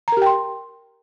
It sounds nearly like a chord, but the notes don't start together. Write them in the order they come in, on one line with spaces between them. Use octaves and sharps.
A#5 A#4 G4 G5 C6